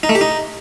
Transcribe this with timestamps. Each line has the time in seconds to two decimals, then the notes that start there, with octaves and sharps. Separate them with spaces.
0.03 D#4
0.09 A3
0.15 G4
0.21 D#4